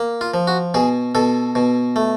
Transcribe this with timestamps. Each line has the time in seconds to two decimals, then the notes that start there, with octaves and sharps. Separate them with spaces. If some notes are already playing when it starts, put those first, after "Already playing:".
Already playing: A#3
0.21 F4
0.34 F3
0.47 F#4
0.74 B2 G#4
1.15 B2 A4
1.55 B2
1.96 A3